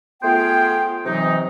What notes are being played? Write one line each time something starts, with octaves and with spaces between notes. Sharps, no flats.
A3 B3 F4 G#4 C5 G5
C3 E3 F#3 D#4